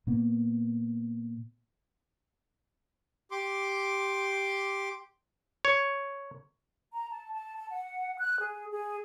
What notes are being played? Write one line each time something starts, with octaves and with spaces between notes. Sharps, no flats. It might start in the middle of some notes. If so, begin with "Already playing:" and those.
A#2 A#3 B3
G4 C6 D6
C#5
A#5
A5
A5
A5
F#5
F#6
G#4
G#4